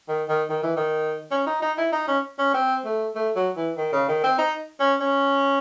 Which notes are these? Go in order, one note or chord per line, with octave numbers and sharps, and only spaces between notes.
D#3
D#3
D#3
E3
D#3
C#4
D#4
D#4
E4
D#4
C#4
C#4
C4
A3
A3
F#3
E3
D#3
C#3
D#3
C4
D#4
C#4
C#4